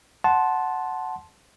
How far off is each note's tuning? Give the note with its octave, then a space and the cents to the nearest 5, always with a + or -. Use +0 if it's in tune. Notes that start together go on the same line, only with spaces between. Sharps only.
F#5 +0 A5 -10 C6 +0